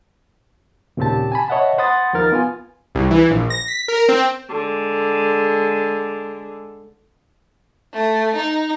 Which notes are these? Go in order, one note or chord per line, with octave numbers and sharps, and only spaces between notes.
D#2 A#2 C#3 C4 G4 A5
G#5 A5 B5
C#5 D#5 E5 F#5 A5 B5
C5 F#5 B5 C6 D#6 A6
D#2 F3 D#4 A#4 F6 A6
B3 F4 G#5
C2
E3
A#1
A#6
B6
A#4
C4
D3 G#3
A3
D#4